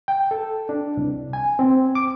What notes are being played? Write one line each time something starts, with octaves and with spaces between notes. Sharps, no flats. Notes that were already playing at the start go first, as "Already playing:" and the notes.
G5
A4
D4
C2
G#5
C4
D6